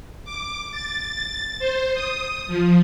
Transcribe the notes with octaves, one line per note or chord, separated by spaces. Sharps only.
D6
A6
C5
D#6
F3